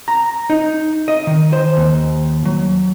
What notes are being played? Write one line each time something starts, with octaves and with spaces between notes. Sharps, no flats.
A#5
D#4
D#5
D#3
C5
D#2
F#3